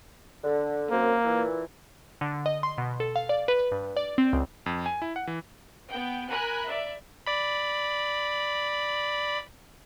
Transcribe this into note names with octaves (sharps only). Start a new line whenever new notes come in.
D3
F#2 A#3 C4
A#2 E3
D3
D#5
C6
B2
A4
F5
D5
B4
G2
D5
C4
C#2
F2
G#5
E4
F#5
E3
B3 G5
A#4 G#5 A#5 B5 F#6
D5 E5
D5 B5